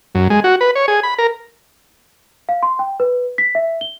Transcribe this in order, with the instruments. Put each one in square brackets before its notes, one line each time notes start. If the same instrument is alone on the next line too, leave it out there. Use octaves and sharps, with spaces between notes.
[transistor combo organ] F#2
G#3
F#4
B4
C#5
G#4
B5
A#4
[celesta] F5
C6
G5
B4
B6
E5
G7